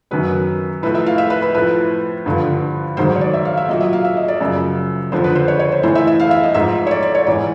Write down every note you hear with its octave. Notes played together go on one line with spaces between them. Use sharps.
F#2 D#3 F#3 B4
A2 F3 B4
E5
F5
E5
B4
B4
A2 F3 B4
G2 D3 F3
G#2 D#3 F#3 C5
C#5
D5
E5
F5
E5
A#2 F#3 D#5
E5
F5
E5
D#5
D5
F#2 C#3 F3
F2 D3 F3 C5
B4
C5
C#5
C#5
C5
A2 E3 C5
E5
E5
F5
E5
D#5
G#2 F3 E5
C#5
D5
D5
C#5
G#2 E3 D5